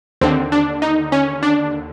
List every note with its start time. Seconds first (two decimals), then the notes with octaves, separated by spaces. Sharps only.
0.21 D#2 D3 C4
0.52 D4
0.82 D#4
1.12 C#4
1.43 D4